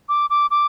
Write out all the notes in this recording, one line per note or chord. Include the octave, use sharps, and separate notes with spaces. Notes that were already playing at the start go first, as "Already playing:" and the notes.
D6
D6
D6